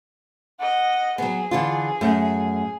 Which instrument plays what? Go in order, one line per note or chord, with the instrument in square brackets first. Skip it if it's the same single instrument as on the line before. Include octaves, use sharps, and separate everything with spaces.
[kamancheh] D#5 F#5
[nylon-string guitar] F#3 B3 [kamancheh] G#4
[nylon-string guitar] D3 E3 F4
F#2 A3